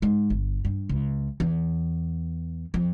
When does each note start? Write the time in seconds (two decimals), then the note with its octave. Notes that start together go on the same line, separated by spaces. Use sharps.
0.02 G#2
0.30 G1
0.65 G2
0.89 C#2
1.40 E2
2.74 F2